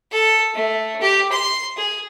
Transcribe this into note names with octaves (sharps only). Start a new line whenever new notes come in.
A4
A3
G4
C6
G#4